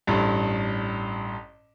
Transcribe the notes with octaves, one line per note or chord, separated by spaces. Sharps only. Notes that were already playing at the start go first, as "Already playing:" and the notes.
A1 G2